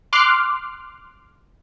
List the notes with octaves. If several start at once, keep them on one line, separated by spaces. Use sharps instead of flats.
C6 D6 F6 F#6 C7